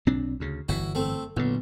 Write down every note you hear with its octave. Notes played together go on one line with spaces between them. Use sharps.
B1 C4 D4
D2 C#3
G1 D3 E3 E4 F#4
A3 C4
B1 A#2 D3